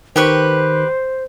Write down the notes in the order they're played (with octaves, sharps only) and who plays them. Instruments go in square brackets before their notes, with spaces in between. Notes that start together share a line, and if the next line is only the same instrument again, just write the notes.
[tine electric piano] D#3 [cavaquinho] G4 B4 C#6 [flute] C5